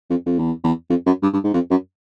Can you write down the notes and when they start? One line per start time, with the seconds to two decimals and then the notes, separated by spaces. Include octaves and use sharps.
0.10 F2
0.26 F2
0.39 E2
0.64 E2
0.90 F2
1.06 F#2
1.23 G2
1.33 G2
1.44 G#2
1.54 F2
1.71 F#2